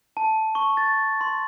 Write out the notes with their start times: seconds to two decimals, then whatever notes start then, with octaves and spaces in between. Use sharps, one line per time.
0.17 A5
0.55 C#6
0.77 A6
1.21 C6